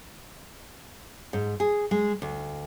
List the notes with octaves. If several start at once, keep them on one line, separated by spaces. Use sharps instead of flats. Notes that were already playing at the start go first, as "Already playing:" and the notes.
G#2
G#4
G#3
D2